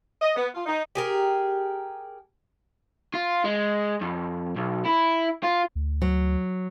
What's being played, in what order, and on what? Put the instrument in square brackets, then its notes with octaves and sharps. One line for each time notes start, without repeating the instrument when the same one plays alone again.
[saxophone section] D#5
B3
F4
D#4
[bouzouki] G4 G#4 A#4
[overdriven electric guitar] F4
G#3
F2
B1
E4
F4
[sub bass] D2
[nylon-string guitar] F#3